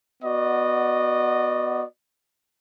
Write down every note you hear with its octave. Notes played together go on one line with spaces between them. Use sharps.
B3 F#4 D5 D#5